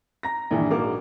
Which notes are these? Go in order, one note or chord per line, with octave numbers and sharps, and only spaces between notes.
A#5 A#6
A#1 G2 D#3 E3
A#1 G#2 A#3 F#4 A#4 D6